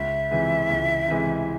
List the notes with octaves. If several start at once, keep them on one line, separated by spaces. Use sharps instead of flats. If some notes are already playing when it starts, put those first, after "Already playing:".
Already playing: C#2 E5
C3 E3 G#3
C#2
C3 E3 G#3